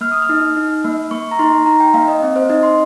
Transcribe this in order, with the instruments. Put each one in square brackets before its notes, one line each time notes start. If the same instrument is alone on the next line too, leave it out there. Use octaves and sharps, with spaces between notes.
[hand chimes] A#3 F6
D#6
F6
D#4
D#4
A#3
A#3 C#6
A#5
D#4 C6
D#4 A#5
G5
A#3 F5
D#5
C4
C5
D#4 D#5
C6